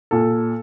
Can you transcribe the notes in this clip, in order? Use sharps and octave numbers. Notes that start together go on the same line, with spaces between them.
A#2 A4